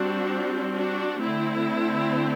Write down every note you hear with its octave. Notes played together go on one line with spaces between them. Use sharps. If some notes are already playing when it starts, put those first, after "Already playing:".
Already playing: G3 C4 D4 F#4
D4 F#4
D3 A3 C4 E4